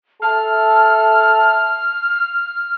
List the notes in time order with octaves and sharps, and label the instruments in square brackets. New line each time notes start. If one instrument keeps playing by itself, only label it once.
[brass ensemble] A4 E5 A5 [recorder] F6